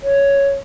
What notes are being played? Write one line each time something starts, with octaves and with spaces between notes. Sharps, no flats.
C#5